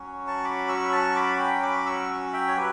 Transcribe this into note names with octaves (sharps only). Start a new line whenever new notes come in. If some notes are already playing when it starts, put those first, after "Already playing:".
Already playing: F#3 C#4 F#4
A5 C#6
B5 D6
C#6 E6
B5
A5 C#6
B5 D6
G5 B5
B5 D6
C#6 E6
E5 G5
C#5
F#3 G4 B4